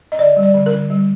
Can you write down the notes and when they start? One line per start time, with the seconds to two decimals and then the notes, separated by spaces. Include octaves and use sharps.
0.12 D#5
0.18 D3 D5
0.37 G3
0.43 D5
0.54 D3
0.66 A#4
0.73 D3
0.90 G3